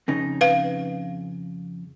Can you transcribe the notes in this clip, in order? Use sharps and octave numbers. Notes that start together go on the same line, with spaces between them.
F2 C#3 D#4
B4 F5